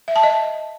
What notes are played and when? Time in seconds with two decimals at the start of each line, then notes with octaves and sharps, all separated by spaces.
0.08 E5
0.16 A5
0.23 D#5